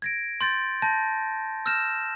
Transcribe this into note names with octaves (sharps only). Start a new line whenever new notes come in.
G#6 A#6 D7
C6 G6 A6
A5 G6 A#6
E6 F6 G6 A#6 E7